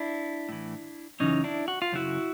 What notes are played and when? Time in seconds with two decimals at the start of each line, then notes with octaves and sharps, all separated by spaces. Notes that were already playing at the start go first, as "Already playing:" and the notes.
Already playing: D4 E4
0.49 A2 E3
1.20 F#2 C#3 E3 C#4 D#4
1.44 D4 E4
1.68 F#4
1.82 F4
1.92 F#2 C#3 E4 F#4